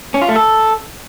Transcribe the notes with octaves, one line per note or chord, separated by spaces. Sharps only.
C#4
F4
A3
A4